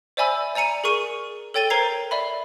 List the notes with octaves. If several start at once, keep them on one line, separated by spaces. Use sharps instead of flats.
C5 D5 E5 G#5 B5 E6
D5 G#5 A#5 C#7 D#7
G#4 A#4 C#6 D#7
A4 C#5 G5 A6 D#7 G7
A#4 C5 A#5 G#6 C7
D5 E5 B5